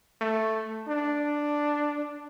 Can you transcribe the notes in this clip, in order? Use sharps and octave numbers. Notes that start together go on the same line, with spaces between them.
A3
D4